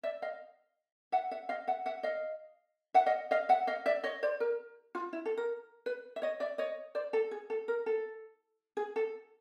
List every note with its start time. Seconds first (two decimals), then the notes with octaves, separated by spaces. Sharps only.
0.03 D5 E5
0.22 D#5 F5
1.12 E5 F#5
1.31 E5 F#5
1.49 D#5 F5
1.67 E5 F#5
1.86 E5 F#5
2.03 D#5 F5
2.94 E5 F#5
3.06 D#5 F5
3.31 D#5 F5
3.49 E5 F#5
3.67 D#5 F5
3.86 D5 E5
4.04 C#5 D#5
4.23 C5 D5
4.40 A#4
4.95 F4
5.13 E4
5.25 A4
5.37 A#4
5.86 B4
6.16 E5
6.22 C#5 D#5
6.40 D5 E5
6.58 C#5 D#5
6.95 C5 D5
7.13 A4
7.31 G#4
7.50 A4
7.68 A#4
7.86 A4
8.77 G#4
8.96 A4